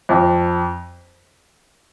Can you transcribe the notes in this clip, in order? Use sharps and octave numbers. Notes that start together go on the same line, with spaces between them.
F2